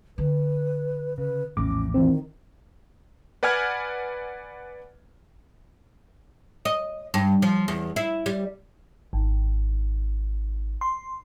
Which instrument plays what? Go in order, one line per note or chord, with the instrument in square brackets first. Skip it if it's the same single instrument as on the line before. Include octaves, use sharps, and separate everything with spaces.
[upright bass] D3 [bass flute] B4
[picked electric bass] C#3 [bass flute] B4
[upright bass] A#1 F3 [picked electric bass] E2 A2 [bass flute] C#4 [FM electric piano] D6
[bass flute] D#3 [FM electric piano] E3 C4
[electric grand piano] B4 D5 F#5 G#5 F6 G#6
[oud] D#5
G2
F3
E2
E4
G3
[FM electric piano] G#1
C6